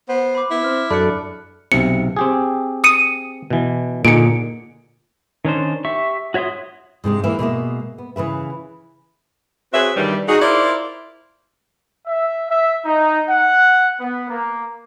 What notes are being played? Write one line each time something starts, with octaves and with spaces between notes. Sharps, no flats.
B3 C5
B5 D6
B3 E4
C4 F6
F#2 D4 A4 D5 B5 F#6 C#7
B1 C3 C#7
C4 G4 G#4
D#6 C#7 D#7
B2 E3
A#2 D3 D#4 G#4 C#7 D7
D#3 C#4 D4 C5
G4 E5 C#6
F#4 C#5 E5 C6 D#6
G#2 C3 G#3 D4
E3 A#3 B4 E5
B2 G#3 A#3 E5
B3
C#3 E3 B4 E5
C4 F#4 G#4 B4 C#5 E5
G2 C3 D#3 E3 G3
D#4 F#4 G#4
E4 F4 A#4 C5 D5
E5
E5
D#4
F#5
B3
A#3